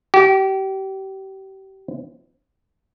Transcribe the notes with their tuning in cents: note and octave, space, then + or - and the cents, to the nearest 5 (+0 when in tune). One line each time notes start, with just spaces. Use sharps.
G4 -30